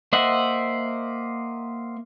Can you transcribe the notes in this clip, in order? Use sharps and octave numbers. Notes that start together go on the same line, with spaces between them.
A#3 C5 D#5 E5 F#5